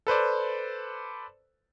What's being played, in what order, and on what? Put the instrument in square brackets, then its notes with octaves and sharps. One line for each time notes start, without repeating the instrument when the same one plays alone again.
[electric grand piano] A4 B4 C5 D5